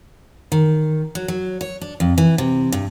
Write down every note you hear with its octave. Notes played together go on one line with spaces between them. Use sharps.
D#3
F#3
F#3
C#5
D4
F2
E3
C3
G2